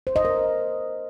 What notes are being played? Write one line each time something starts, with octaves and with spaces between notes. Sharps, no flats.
C5
D#5
A#4